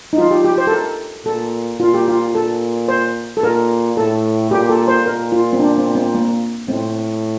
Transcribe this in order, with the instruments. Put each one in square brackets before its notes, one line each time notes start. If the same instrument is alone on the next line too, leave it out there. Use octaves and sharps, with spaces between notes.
[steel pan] D#4
[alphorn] F3 [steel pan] F4
[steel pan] G4
G4
C5
A4
A#4
[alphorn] A#2 [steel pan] A4
[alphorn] A#2 [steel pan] F4
[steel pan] G4
F4
[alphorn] A#2 [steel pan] A4
[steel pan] C5
A4
[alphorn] A#2 [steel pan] A#4
[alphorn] A2 [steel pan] A4
[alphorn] A#2 [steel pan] G4
[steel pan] A4
C5
[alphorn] A#2 [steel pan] A#4
[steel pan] F4
C4
D4
C4
C4
A#3
[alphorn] A2 [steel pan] C4